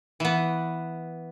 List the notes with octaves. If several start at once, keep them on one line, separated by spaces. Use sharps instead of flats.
E3 B3